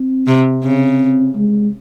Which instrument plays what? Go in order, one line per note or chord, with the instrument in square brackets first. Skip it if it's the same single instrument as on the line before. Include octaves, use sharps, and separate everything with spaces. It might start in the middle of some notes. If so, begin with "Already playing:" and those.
Already playing: [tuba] C4
[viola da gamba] C3
[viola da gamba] C#3 [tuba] C4
[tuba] G#3